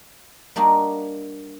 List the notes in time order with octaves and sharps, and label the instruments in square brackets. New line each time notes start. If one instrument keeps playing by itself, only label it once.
[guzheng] G3 A#3 D4 F#4 D#5